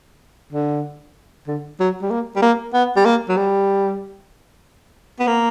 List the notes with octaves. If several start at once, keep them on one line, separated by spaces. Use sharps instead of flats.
D3
D3
F#3
G3
A#3
G3
A#3
B3
G3
A#3
F#3
G3
B3
A#3